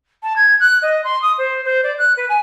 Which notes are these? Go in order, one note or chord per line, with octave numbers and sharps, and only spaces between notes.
A5
G#6
F#6
D#5
C6
D#6
C5
C5
D5
F#6
B4
G#5